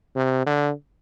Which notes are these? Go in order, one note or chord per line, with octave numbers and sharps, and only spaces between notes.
C3
D3